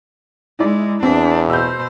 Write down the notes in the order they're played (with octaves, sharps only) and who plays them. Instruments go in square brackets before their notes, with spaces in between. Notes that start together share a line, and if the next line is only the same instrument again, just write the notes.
[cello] G#3 [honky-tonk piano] D#4 E4 D5
[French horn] E2 [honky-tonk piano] C4 [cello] D4
[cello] B2 C5 [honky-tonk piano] E6 G6